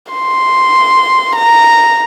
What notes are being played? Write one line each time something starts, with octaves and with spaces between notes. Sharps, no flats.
C6
A#5